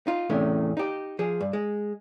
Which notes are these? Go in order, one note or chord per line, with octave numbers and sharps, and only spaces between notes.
D#4 F4
E2 A2 C3 A3 C#4
D#4 G4
F3 G#4
G2
G#3